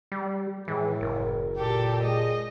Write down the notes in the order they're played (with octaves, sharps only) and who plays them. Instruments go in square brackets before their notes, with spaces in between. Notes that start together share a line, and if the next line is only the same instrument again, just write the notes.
[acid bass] G3
[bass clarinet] A2 [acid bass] E3 [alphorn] G#3
[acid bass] F#1 [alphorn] A#4
[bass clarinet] A#2 [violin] G4 A4
[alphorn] G#3 [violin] D#5